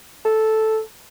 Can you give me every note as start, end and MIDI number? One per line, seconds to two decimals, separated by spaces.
0.25 0.79 69